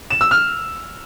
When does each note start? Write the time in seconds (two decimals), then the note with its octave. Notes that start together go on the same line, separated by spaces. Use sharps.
0.10 E7
0.21 E6
0.31 F6